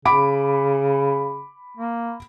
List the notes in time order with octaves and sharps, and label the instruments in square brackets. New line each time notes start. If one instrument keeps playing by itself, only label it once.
[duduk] C#3 [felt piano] B5 D6 D7
[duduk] A#3